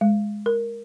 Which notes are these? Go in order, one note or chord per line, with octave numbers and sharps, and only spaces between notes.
G#3
A#4